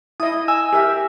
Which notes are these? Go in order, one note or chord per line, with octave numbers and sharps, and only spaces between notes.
E4 D#5 D#6
G#5 E6
G4 A#4 E5